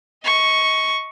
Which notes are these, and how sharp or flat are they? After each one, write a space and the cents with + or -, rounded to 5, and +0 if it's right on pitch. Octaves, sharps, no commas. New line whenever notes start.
D#5 +25 C#6 +0